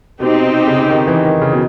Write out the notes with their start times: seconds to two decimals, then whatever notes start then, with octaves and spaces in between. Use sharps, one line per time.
0.20 B2 C4 D#4 G4
0.43 C3
0.67 C#3
0.89 D#3
1.07 E3
1.25 D#3
1.41 C#3
1.52 B2